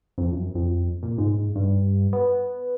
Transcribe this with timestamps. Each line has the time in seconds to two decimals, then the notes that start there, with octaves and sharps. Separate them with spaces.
0.18 F2
0.33 F#2
0.55 F2
1.03 A#2
1.18 G#2
1.55 G2
2.13 B3